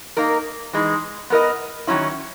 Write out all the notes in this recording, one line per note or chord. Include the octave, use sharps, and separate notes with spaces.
A#3 D#4 A#4
E3 G#3 D#4
B3 E4 A#4 D#5
D#3 F#3 C#4 E4